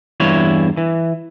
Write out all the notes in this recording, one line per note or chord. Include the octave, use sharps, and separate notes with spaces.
E2 G2 E3 E4 F4 C#5
E3